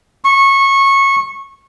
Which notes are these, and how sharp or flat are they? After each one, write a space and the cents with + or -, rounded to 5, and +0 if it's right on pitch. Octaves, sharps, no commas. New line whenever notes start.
C#6 -20